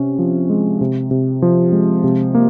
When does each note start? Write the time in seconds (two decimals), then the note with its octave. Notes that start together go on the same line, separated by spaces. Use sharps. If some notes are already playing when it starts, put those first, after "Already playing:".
Already playing: C3 C#4
0.19 F3
0.50 G#3
0.81 C3
1.11 C3
1.42 F3
1.72 G#3
2.04 C3
2.35 A#3